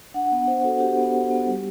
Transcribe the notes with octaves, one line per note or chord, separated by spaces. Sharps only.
D4 F#5
B3
B3 C5
F#4 A4
D4 G4
B3
D4
B3
G3